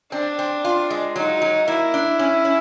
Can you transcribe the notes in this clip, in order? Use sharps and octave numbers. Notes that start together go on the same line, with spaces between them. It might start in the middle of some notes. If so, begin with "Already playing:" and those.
C4 D4
C4
F4
G#3
F#3 D#4
F#3
A#3 E4
D4
C#4
C#4